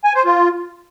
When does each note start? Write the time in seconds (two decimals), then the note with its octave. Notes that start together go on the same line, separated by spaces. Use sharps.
0.04 G#5
0.15 C5
0.25 F4